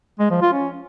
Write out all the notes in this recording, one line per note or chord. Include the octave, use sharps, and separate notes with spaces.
G#3
F3
F4
C#4